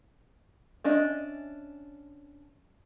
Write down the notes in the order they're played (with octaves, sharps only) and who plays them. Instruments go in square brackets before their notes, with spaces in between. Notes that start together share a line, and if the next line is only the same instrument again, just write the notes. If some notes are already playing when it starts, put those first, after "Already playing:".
[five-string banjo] C#4 D4 D#5 E5